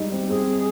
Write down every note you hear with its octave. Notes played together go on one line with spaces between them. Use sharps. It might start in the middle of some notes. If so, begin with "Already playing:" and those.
Already playing: G3 G#3 D#4
C4
C4 G#4